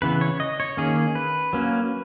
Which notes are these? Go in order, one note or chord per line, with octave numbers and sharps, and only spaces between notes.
C#3 E3 B3 B4
C#5
D#5
C#5
D#3 A#3 C#4 G#4
B4
F#3 A#3 C#4